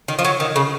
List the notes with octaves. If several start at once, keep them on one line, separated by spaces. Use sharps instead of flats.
D#3
F3
F#3
D#3
C#3